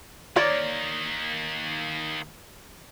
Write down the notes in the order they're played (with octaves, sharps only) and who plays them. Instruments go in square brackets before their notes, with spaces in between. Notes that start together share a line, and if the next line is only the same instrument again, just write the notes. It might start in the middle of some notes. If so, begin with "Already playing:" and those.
[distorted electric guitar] D#3 A#3 [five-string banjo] A#4 C#5 D5